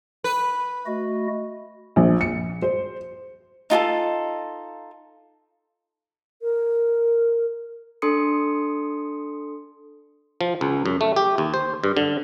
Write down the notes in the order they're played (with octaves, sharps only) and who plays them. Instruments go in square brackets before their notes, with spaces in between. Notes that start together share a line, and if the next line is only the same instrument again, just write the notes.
[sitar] B4
[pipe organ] A3 F#4 D#5
[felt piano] A#1
C#7
C5
[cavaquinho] D#4 F4 G#4 A4
[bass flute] A#4
[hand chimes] D4 A4 C6 D#6 C#7
[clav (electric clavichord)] F3
C#2
F#2
A3
G4
D#2
C5
G2
D3